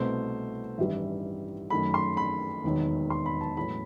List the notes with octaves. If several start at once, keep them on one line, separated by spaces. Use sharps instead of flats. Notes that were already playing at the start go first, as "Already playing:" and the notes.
Already playing: C2 B2 A3 C5
A1 G2 D#3 G3 E5
F#2 D#3 A3 B5
C6
B5
E1 D#2 D#3 F#3
C6
B5
A5
A1 A2 F#3 A3 B5